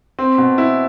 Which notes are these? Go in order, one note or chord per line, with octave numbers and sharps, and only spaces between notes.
C4
B2
E4